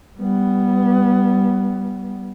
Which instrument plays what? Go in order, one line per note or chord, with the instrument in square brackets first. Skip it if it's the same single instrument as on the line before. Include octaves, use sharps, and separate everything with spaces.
[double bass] G3 B3